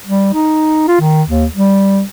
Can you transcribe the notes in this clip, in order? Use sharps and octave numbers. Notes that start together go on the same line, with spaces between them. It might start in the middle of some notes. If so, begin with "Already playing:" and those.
G3
D#4
F4
D#3
D#2
G3